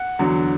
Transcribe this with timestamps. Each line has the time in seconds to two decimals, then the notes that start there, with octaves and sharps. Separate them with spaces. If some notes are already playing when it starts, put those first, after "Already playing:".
Already playing: F#5
0.19 E2 D3 F#3